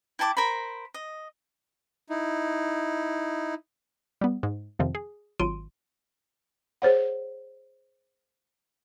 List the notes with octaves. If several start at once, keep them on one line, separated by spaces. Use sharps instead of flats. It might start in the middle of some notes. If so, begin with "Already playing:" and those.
E4 G5 A5 D6
A#4 C5 B5
D#5
D#4 E4
G3 B3
G#2
F2 C3 D#3 F3 C4
G#4
G#1 F#3 F4 C6 D7 D#7
G#4 C5 C#5 F#5